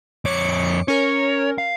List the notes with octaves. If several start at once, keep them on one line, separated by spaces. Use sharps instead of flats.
F2 C#5 D6 C#7
C#4 A#4 C#5
F5